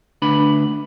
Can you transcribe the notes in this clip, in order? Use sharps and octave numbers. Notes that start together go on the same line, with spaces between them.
D2 D4 B4 B5